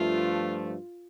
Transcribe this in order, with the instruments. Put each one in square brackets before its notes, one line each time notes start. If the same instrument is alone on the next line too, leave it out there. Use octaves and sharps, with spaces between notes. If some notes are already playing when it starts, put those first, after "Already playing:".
Already playing: [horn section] G2 F3 A3 [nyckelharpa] F4